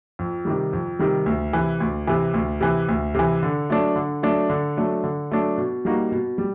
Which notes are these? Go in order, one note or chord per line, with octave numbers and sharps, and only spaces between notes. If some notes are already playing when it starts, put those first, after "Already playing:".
F2
C3 D#3 G3
F2
C3 D#3 G3
D2
C3 E3
D2
C3 E3
D2
C3 E3
D2
C3 E3
D3
F#3 A3 D4
D3
F#3 A3 D4
D3
F#3 A3 D4
D3
F#3 A3 D4
B2
G3 A#3 D#4 F#4
B2
G3